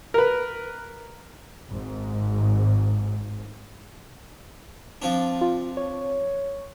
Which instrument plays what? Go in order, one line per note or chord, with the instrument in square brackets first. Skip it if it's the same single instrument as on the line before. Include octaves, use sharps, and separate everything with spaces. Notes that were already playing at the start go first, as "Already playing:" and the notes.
[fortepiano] A#4 B4
[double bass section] G#1 G#2
[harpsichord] F3 C4 D4
[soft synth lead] F4
C#5